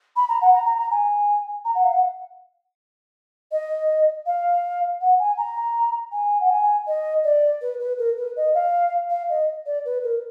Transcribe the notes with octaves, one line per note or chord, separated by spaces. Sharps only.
B5
A#5
F#5
A#5
A#5
A#5
G#5
A#5
F#5
F5
F#5
D#5
F5
F#5
G#5
A#5
G#5
F#5
G#5
D#5
D5
B4
B4
A#4
B4
D#5
F5
F5
D#5
D5
B4
A#4